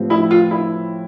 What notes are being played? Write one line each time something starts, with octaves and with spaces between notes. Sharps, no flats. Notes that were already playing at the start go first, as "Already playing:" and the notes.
Already playing: A2 F3 C4 G4 B4
E4
F4
E4